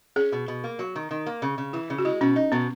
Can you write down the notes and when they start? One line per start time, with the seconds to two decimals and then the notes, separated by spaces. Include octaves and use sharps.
0.16 C#4 G#4
0.32 B2
0.48 B2
0.64 A#3
0.79 F#3
0.96 D#3
1.11 D#3
1.26 A#3
1.42 C#3
1.58 C#3
1.73 E3 E4
1.90 C#3
1.99 F#4
2.05 G#3 E4
2.21 B2 C#4
2.36 D#4
2.52 B2 B3